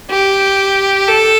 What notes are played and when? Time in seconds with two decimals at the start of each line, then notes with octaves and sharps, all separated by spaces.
0.10 G4
1.08 A4